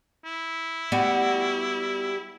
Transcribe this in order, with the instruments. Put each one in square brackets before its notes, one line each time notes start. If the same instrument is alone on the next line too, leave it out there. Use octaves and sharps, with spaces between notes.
[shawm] E4
[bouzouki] G3 F#4 G4 [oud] B3